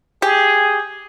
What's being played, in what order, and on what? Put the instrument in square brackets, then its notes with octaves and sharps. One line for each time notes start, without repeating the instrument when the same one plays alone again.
[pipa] G4 [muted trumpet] G#4